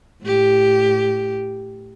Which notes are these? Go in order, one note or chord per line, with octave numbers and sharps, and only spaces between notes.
A2 G4